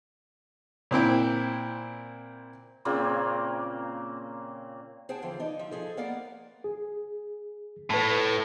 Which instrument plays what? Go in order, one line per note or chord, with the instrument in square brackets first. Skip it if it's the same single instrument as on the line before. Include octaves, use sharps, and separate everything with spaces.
[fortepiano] A#2 C4 E4 G5
[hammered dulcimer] A#2 C#3 A#3 C4
[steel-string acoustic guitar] G#4 C5 F#5 G5 A5
E2 D3 E3 F3
D4 D#4
F3 E5
F3 G#4 A4
A#3 B3 A#4 D5 F5 F#5
[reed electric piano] G#4
[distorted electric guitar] A2 [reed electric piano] B4 A5